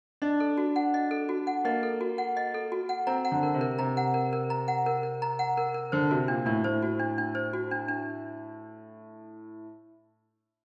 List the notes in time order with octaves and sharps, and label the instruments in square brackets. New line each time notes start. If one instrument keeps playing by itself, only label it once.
[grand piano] D4 [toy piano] D#5
[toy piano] A4
F#4
F#5
D#5
A4
F#4
F#5
[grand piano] A#3 [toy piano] D#5
[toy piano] A4
F#4
F#5
D#5
A4
F#4
F#5
[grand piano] C4 [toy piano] A#5
[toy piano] F#5
[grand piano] D3
[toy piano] A#4
[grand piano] C3
[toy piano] A#4
[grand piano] C3 [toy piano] A#5
[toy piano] F#5
A#4
A#4
A#5
F#5
A#4
A#4
A#5
F#5
A#4
A#4
[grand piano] D3 [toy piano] C5
[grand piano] C3 [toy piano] F#4
[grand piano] A#2 [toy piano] D4
[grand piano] A2 [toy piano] D4
[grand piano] A2 [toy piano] C5
[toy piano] F#4
D4
D4
C5
F#4
D4
D4